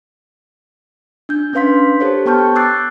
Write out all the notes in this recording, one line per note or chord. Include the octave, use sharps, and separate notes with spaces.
D4 G6
C#4 D4 B4 F5 C6 B6
G4 A4 C5 C#5
B3 G5 A5 C#6 F6 G6
D6 E6 F#6 G6 A6 C7